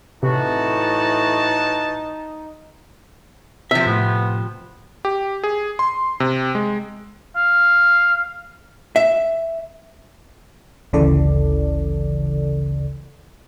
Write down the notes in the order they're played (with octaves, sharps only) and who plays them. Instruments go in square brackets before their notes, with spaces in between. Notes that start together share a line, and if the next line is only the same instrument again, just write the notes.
[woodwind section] A2 E3 F#4 [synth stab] C3 [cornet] D#4 [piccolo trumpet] A5
[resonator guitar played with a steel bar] C3 F3 [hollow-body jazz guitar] E5
[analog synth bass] A2 [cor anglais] B3
[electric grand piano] G4
G#4
C6
C3
G#3
[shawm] F5
[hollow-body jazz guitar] E5
[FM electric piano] G#1 D2 C#3 E3 A4 D5